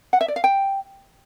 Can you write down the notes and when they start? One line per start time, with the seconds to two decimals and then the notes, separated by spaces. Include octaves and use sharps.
0.13 F#5
0.21 E5
0.28 D5
0.36 F5
0.44 G5